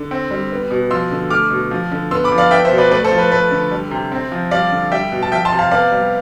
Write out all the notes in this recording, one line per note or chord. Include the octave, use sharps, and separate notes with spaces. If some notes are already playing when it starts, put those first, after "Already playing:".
Already playing: D3
C4
G3
B3
B2
F3 C6 E6
D3
A3 D6 F6
B2
F3
D3
B3 C6 E6
B5 D6
F3
D5 F5
B3 E5 G5
C5 E5
B2
B4 D5
A3 B4 D5
A4 C5
F3
B4
A3 B4
D3
G3
C3
C4
F3
G3 D5 F5
D3
G3 E5 G5
B2
A5
F3 E5 G5
A5 C6
C3
F5 A5
B3 D5 F5
G3